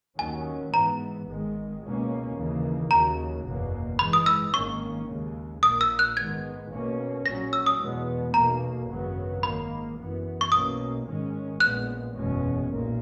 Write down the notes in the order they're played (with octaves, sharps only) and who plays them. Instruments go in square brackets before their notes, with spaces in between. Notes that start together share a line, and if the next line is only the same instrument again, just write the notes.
[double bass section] D#2 D#3 F#3 C#4 [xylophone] G#5
[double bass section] G#2 E3 B3 [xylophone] A#5
[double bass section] G#1 G#2 D#3 G#3
C#2 B2 A#3 C#4
D#2 C#3 E3 A#3
[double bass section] D#2 C#3 F#3 [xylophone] A#5
[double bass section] F#1 E2 B2 A#3
[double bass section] G#2 E3 G#3 [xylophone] B5
[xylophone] D#6
E6
[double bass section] G#1 G#2 D#3 A#3 C#4 [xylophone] C#6
[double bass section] D#2 C#3 G#3
[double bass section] A#1 A#2 A#3 [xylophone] D#6
[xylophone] E6
F#6
[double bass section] G#2 D#3 G#3 B3 [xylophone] G#6
[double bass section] B1 B2 A#3 C#4
[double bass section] A#1 A#2 F#3 C#4 [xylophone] A#6
[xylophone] E6
D#6
[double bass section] E2 B2 G#3 B3
[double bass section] B1 B2 A#3 [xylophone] A#5
[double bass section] G#1 F#2 C#3 F#3 B3
[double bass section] G#1 G#2 D#3 A#3 [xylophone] B5
[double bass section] F#2 E3 B3
[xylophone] C#6
[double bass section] B1 B2 A#3 C#4 [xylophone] D#6
[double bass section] G#2 D#3 G#3 C#4
[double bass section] A#1 A#2 G#3 B3 [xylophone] F#6
[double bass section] F#1 E2 B2 G#3 C#4
B1 A#2 A#3